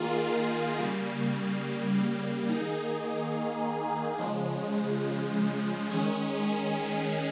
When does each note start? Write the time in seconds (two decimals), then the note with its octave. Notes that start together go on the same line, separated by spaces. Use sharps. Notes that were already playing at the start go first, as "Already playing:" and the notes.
Already playing: D#3 A#3 F4 G#4
0.79 C#3 G3 A#3
2.48 D#3 A#3 D#4 G#4
4.18 C#3 F3 G#3
5.89 D#3 G#3 C#4 G#4